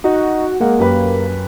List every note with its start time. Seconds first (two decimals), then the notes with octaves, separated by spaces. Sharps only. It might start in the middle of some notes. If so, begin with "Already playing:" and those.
0.04 D#4 F#4
0.60 G#3 A#3 F#5
0.79 F#2 G4 B4